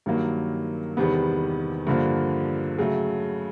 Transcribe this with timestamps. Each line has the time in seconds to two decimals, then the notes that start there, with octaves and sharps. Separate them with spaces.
0.06 G2 D#3 F#3 A#3
0.97 E2 C3 D#3 G3 B3
1.87 G2 D3 F3 A#3
2.78 C#3 F#3 A3